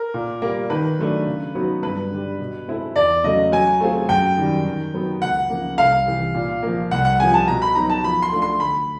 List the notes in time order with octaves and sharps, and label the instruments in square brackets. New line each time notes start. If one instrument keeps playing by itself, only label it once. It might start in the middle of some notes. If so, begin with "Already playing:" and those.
Already playing: [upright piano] A#4
[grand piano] A#2
G3 A#3
[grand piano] D#3 [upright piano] B4
[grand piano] F#3 A3 D4
C#3
F#3 B3 D#4 F#4
[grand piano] G2 [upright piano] B4
[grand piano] D3 G3
B2
G#3 C4 E4 A4
[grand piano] E2 [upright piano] D5
[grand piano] C#3 F#3 A3 [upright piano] D#5
[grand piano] F#3 [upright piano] G#5
[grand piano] A3 C4 F4 G#4
[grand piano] F#2 [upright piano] G5
[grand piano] D#3 G3
D#3
F#3 B3 D#4
[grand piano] C#2 [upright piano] F#5
[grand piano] C#3 F3 A#3
[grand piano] C2 [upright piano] F5
[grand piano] C3 E3
A#2
F3 A#3
[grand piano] C2 [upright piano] F#5
[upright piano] F#5
[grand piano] C3 F3 [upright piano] G#5
[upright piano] A5
[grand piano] B2 [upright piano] A#5
[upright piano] B5
[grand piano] F#3 B3 D#4 [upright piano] A#5
[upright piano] A5
[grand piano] F3 [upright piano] B5
[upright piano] C6
[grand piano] A3 D4 F4
[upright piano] C6
[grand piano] D2 [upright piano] B5